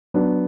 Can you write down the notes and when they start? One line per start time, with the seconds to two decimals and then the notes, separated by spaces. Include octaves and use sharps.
0.14 F#3 B3 D4